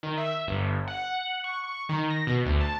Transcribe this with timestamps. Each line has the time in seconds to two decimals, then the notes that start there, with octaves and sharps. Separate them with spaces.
0.03 D#3
0.18 E5
0.47 G1
0.88 F#5
1.44 C#6
1.64 C#6
1.89 D#3
2.10 A#6
2.27 B2
2.45 D2
2.61 A5